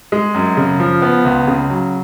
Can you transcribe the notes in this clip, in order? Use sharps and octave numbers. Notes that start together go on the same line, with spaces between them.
G#3
F#2
C#3
F3
B3
C#2
C#3
F#3